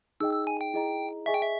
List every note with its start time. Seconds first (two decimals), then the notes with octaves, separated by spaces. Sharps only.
0.20 D#4 G#4 D#5 G5 E6
0.33 E6
0.47 G#5
0.61 G5
0.74 E4 G#4 D#5 A#5
1.26 G#4 D#5 E5 G#5 C#6
1.34 G5
1.41 E5